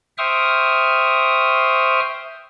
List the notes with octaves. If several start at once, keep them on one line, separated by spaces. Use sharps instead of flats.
C5 E5 G5 C#6 D#6 F6